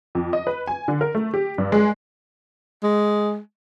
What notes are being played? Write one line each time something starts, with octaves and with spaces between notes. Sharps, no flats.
F2
D#5
B4
G#5
D3
A#4
A3
G4
G2
G#3
G#3